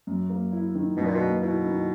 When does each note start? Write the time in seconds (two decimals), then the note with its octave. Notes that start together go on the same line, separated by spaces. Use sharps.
0.07 F#2
0.30 A#3
0.52 E4
0.75 D#3
0.97 F#2 B2
1.06 A#2
1.15 B2
1.20 A#3
1.42 B2 E4
1.65 D#3